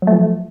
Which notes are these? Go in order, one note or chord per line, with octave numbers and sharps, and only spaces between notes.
F3 F#3 A3